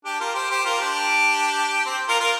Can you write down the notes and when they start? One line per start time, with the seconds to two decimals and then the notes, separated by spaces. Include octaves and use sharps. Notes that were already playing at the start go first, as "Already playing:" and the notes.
0.05 D4 G4
0.20 F4 A#4
0.35 G4 C5
0.50 G4 C5
0.65 F4 A#4
0.80 D4 G4
1.86 C4
2.09 F4 A#4
2.20 F4 A#4